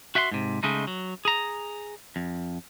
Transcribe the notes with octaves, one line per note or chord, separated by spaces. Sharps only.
F#4 E5 F#5 G5 C6
G#2 C3
C#3 G#3 A3 D#4
F#3
G#4 A#5
F2